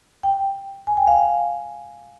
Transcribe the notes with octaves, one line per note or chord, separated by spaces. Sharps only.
G5
G#5
G5
F5